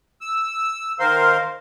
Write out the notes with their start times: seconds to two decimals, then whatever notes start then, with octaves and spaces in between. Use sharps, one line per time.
0.21 E6
1.00 D#3 A#4 C5 F5 C6